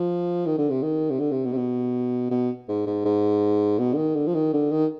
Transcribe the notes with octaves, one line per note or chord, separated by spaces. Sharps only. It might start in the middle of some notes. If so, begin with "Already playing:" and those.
Already playing: F3
D#3
D3
C3
D#3
C3
D3
C3
B2
C3
B2
B2
G#2
G#2
G#2
B2
D3
D#3
D3
F3
D#3
D3
D#3